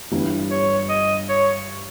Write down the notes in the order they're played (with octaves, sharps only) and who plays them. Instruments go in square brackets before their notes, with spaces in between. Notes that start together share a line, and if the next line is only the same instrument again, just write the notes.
[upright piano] G1 G2 E3 G3 [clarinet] E4
[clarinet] C#5
D#5
C#5